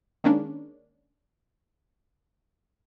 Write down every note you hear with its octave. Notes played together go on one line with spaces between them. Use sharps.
D#3 G#3 A#3 C#4 D4